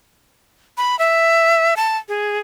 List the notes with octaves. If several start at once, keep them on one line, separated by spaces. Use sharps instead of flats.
B5
E5
A5
G#4